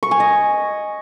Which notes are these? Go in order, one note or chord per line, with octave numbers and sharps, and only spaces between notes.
C#6
G#5
D#5